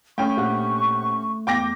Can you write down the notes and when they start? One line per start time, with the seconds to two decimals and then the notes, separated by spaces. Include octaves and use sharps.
0.18 A3 C#4 G5 C#6
0.37 A#1 G4 F#5
1.47 E2 G5 D6 A#6